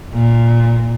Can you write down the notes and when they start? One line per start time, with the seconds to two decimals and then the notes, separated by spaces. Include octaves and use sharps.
0.13 A#2